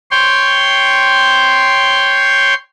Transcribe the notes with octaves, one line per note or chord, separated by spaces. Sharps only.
C#5 G5 C6